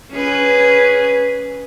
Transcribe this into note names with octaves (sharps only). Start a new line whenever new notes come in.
C#4 G#4 B4